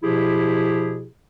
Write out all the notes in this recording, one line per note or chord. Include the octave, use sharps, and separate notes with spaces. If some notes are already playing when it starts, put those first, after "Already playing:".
B2 F3 E4 G4 G#4